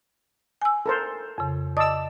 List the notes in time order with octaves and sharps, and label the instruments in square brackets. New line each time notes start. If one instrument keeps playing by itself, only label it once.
[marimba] G#5 E6
[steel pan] A4 A#4 C5
[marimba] F2 C#3
[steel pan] D5 E6 [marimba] D#5 A5 D#6